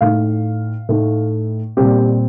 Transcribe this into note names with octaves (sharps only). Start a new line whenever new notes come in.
A2 A3 D#4 F5
A2 A3 D#4
A#2 G3 C4 G4